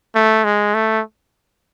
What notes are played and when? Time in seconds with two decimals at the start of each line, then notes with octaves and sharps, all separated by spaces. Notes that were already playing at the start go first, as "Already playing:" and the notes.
0.15 A3
0.44 G#3
0.74 A3